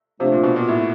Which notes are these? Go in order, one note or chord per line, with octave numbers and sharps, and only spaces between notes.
C3 F3 A3 D4
A#2
B2
A#2
A2